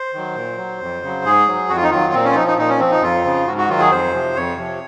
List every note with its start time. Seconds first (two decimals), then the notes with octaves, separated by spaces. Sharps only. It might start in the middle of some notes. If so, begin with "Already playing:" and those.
Already playing: C5
0.14 D#3 F#3
0.36 A#2
0.58 F#3
0.81 F2
1.02 C#3 F#3
1.24 G#2 G#4
1.47 F#3
1.69 F2 F#4
1.77 F4
1.83 D#4
1.91 D#3 F#3 F4
2.13 A#2 C4
2.24 C#4
2.31 F4
2.35 F3 D#4
2.47 D#4
2.58 A#2 D#4
2.69 C#4
2.80 F3 C4
2.91 D#4
3.02 F2 F4
3.24 C#3 F3
3.47 G#2 F#4
3.58 F#4
3.69 D#3 F#3 F4
3.80 G#4
3.91 F2 C5
4.13 C3 F3
4.35 F2 C#5
4.57 C3 F3